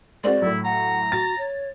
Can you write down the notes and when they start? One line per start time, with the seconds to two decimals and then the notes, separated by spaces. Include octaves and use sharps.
0.24 G#3 C4 F#4 D5
0.42 A2 F#3 E4
0.65 F#5 A#5
1.12 F#4 A6
1.38 C#5